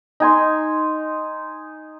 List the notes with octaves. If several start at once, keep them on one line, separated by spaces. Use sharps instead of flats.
D#4 G#5 C6